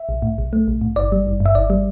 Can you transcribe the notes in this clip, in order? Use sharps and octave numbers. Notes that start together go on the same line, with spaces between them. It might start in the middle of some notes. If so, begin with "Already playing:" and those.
Already playing: E5
B1
A2
B1
A3
B1
A2
G1 D5
G3
G1
G2
E5
G1 D5
G3